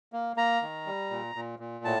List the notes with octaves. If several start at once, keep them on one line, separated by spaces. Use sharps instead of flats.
A#3
A#3 A#5
D#3
G3
A#2
A#2
A#2
A2 A5